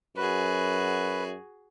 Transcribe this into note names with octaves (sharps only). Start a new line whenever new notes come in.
F#2 F#4 G#4 B4